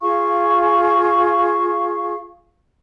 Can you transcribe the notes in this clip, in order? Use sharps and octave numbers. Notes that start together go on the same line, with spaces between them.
F4 G#4 F5 C#6